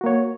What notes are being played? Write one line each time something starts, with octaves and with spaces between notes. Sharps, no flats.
A#3 F#4 C#5